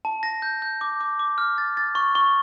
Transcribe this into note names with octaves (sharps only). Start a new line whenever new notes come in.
A5
A#6
G6
G6
D6
D6
D6
F6
A6
A6
C#6
C#6